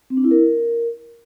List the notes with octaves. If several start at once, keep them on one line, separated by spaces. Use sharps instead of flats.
C4
D4
E4
A#4